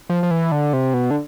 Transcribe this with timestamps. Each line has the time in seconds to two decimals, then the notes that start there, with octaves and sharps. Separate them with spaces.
0.09 F3
0.23 F3
0.31 E3
0.52 D3
0.73 C3
0.94 B2
1.11 D3